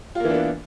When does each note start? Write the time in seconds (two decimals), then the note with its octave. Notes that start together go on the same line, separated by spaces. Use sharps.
0.15 F4
0.20 A#3
0.25 E3
0.29 D4
0.34 B3